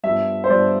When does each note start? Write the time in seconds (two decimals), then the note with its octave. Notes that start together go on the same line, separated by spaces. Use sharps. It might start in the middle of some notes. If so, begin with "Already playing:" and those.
0.03 G2 F3 B3 E5
0.44 C5
0.50 G2 F3 B3 D5